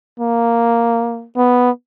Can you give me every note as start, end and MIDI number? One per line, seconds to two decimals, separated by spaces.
0.20 1.27 58
1.36 1.71 59